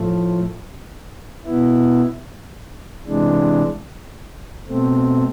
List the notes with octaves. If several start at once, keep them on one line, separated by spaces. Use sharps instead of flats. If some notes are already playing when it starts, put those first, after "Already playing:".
Already playing: A2 F3 A3
B2 B3 E4
C3 E3 G#3 D4
B2 A3 C4